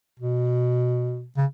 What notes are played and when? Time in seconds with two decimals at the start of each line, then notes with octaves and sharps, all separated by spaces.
0.19 B2
1.37 C#3